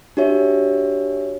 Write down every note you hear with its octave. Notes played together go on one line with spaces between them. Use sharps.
D4 F#4 G4 C#5 E5